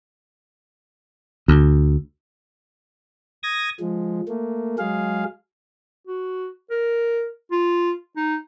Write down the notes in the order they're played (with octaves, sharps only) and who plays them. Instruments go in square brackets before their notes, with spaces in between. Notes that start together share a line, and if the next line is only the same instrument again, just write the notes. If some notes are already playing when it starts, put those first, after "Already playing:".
[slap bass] D2
[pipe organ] D#6 G#6 A#6
F3 G#3
A3 A#3
F#3 G#3 G#4 F5
[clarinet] F#4
A#4
F4
D#4